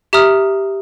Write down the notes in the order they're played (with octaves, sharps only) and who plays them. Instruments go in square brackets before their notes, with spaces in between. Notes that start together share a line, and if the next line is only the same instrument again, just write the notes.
[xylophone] G4 E5 A#5 D#6 F6